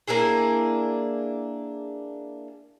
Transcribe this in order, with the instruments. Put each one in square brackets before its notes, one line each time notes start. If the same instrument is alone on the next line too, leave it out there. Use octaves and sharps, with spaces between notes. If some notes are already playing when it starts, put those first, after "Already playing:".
[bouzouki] A#3 D4 E4 G#4